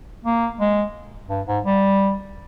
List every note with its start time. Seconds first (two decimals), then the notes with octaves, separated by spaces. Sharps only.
0.25 A#3
0.60 G#3
1.29 G2
1.47 G#2
1.65 G3